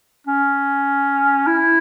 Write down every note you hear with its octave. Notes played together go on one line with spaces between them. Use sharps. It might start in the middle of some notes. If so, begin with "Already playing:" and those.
C#4
E4